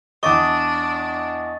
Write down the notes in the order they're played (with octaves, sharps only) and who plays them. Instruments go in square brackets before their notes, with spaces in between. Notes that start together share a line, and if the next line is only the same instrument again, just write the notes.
[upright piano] E2 D6 [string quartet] D4 [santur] D#5 [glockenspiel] C#6 A6